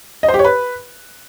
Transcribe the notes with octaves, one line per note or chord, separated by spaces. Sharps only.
D#5
C5
G4
C#5
B4